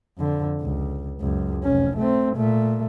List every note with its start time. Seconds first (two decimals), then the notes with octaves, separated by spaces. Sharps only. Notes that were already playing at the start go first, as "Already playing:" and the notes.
0.18 F2 D3
0.61 C#2
1.20 C#2 F#2
1.64 F1 C#4
1.97 A3 C4
2.36 A#2 A3